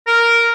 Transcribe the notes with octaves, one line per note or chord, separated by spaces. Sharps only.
A#4